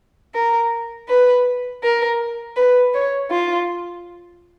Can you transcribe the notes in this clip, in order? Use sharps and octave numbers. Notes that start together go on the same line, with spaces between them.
A#4
B4
A#4
B4
C#5
F4